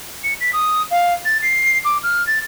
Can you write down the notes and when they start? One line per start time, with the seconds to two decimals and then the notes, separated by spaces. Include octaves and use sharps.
0.23 C#7
0.40 B6
0.53 D#6
0.91 F5
1.25 A6
1.42 C7
1.85 D6
2.03 F6
2.27 A6